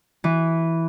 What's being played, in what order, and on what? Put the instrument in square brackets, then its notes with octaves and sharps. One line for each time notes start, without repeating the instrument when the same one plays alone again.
[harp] E3